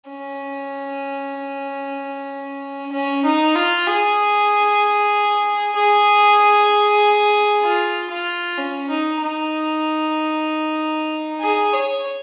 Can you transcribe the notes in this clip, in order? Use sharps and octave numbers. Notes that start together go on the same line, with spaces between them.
C#4
C#4
D#4
F4
G#4
G#4
F4
F4
C#4
D#4
D#4
G#4
C#5